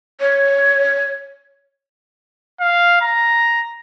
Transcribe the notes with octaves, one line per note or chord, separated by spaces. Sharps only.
C#5
F5
A#5